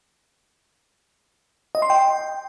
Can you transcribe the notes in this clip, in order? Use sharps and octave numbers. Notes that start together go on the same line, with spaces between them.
D#5
C6
G5